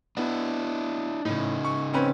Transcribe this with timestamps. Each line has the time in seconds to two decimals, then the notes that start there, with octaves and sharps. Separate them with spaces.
0.17 B3 D4 E4
1.25 A2 C#3 D#4
1.65 C#6
1.93 C4 C#4 B4